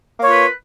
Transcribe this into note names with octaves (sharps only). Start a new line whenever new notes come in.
A#3 F4 B4 C#5